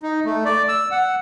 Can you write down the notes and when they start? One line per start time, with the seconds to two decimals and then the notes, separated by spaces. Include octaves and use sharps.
0.03 D#4
0.25 A3
0.45 D5
0.69 E6
0.91 F#5